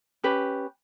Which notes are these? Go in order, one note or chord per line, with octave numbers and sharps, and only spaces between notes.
C#4 G4 B4